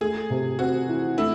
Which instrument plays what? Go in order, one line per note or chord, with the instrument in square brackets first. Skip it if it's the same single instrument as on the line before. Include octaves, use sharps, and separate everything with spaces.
[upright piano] A3 [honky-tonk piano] G#4
[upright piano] C3
[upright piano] C4 [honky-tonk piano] F#4
[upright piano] E3
[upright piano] A3 [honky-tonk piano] E4